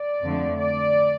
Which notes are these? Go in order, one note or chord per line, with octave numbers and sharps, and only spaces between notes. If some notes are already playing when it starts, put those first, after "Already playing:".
Already playing: D5
F2 D3 A3
D5